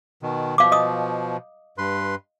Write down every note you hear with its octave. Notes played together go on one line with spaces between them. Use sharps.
B2 D#3
B2 F3 F5 D6
D#5 D#6
G2 B4 C6